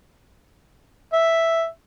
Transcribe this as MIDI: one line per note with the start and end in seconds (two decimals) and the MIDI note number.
1.13 1.66 76